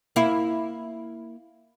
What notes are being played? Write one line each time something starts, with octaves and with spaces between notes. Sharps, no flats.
A#3 E4